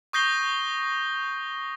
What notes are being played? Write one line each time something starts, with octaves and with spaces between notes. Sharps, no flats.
C#6 D#6 G6 A#6 C7 G7